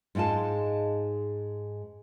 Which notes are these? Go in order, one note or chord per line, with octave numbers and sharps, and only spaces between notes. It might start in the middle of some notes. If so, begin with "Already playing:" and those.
G#2 G#3 D#4 F4 A5